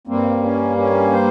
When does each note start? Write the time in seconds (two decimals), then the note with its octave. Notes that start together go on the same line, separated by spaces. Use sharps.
0.07 G2 G3 A#3 C4
0.43 C#4
0.77 C#4
1.12 C5